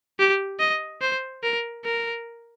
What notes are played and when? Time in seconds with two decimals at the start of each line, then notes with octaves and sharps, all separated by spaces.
0.19 G4
0.59 D#5
1.01 C5
1.43 A#4
1.85 A#4